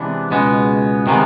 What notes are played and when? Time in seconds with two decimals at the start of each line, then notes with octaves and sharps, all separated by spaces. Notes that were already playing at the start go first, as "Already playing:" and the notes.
Already playing: C3 E3 G#3 B3 D4
0.31 C#2 B2 G#3 B3
1.07 C3 D#3 G#3 B3